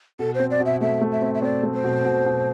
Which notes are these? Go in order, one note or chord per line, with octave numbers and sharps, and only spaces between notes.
B2 A4
C4 C5
D5
B2
E5
A3 E5
A3
E5
C4
E5
C4 D5
A3
C5
B2
B2
B2